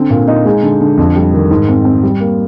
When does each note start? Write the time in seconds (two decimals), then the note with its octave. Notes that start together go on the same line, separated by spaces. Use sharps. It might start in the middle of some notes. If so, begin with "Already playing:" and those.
Already playing: D3 C4
0.10 A#2
0.28 D#4
0.45 G#3
0.63 D3
0.81 D3
0.98 F2
1.16 G3
1.33 D#3
1.51 G#2
1.68 C4
1.85 C4
2.03 G3
2.21 A#3